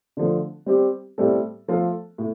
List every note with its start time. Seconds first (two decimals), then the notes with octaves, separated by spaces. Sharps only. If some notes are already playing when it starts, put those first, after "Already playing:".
0.17 D3 F3 A3
0.66 G3 C4 G4
1.18 A2 G3 C4 A4
1.68 F3 A3 F4 A4
2.18 A2